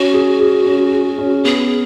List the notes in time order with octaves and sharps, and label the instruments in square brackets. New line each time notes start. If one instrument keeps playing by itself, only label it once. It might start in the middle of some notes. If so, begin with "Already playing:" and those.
Already playing: [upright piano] C#4 [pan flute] F#4
[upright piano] G#4
G#4
C#4
G#4
C#4
[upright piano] B3 [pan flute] G#4